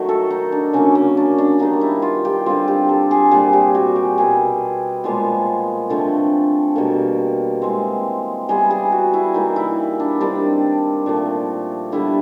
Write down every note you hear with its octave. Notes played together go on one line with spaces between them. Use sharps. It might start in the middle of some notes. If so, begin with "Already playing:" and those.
Already playing: D#3 F#3 A3 F#4
A4
D#4
D4
C#3 F#3 A#3 C#4
C#4
D4
D4
D#3 G3 B3 D#4
E4
F4
G4
D3 G3 C4 F4
G4
A4
G#4
A#2 G3 C4 G#4
G4
F#4
G4
B2 G3 B3 G#4
A#2 F3 G#3 B3
D3 F3 A3 C4
B2 G3 A#3 A4
E3 G#3 C4
E3 G3 B3 G#4
G#4
F#4
E4
E3 G3 A#3 D#4
E4
D4
D#3 G3 C4 D4
A#2 F3 A3 C4
D3 G3 B3 E4